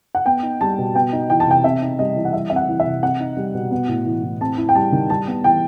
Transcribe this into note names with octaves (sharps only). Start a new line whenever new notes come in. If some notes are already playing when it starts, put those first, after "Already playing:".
F#5
B3 G5
D#4
G3 A5
B2
B3 G5
D#4
E3 G5
A5
C3 G5
C4 E5
D#4
G3 D#5
E3
F#5
G3 E5
C4 E5
F#5
E3
E5
C3
C4 F#5
D#4
G3
B2
B3
A2
E3
A2
C4 A5
E4
G5
G3 A5
D#3
G3 A5
B3
E3 G5